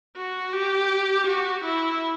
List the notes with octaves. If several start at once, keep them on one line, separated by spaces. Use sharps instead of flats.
F#4
G4
F#4
E4